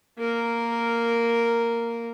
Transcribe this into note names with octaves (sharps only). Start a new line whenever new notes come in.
A#3 A#4